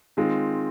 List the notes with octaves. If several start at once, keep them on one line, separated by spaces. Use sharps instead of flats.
D#3 G#3 C4 F4